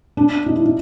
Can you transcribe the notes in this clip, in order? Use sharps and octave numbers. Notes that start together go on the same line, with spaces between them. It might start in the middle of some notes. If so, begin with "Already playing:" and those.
D4
D#4
E4
D#4